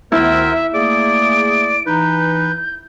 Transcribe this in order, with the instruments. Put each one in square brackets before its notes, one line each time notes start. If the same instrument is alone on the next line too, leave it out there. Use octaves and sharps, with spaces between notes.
[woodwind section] D2 D#3 B3 [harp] E4 [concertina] A#4 C5 [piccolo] E5
[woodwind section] A3 A#3 G#4 [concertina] D5 [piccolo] D7
[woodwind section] E3 D#4 [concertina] B4 [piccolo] G6